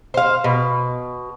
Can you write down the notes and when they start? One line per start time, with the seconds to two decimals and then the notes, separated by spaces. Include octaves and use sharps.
0.14 C5 F5
0.44 B2